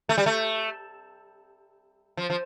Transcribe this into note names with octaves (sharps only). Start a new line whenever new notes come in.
A3
G3
A3
F3
F3